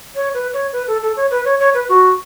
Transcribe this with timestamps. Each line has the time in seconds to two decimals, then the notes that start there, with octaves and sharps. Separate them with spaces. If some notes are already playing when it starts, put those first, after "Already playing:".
0.15 C#5
0.34 B4
0.53 C#5
0.73 B4
0.87 A4
1.02 A4
1.16 C#5
1.31 B4
1.45 C#5
1.59 C#5
1.74 B4
1.89 F#4